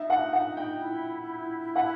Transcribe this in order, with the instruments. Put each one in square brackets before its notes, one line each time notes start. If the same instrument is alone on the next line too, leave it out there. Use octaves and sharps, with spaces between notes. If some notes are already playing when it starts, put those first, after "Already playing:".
Already playing: [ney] D#4 [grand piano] E5
[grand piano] F#5
F#5
G5
[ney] E4
[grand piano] F#5